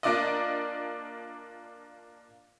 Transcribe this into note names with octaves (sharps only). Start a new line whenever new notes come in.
A#3 D4 F4 D5 D#5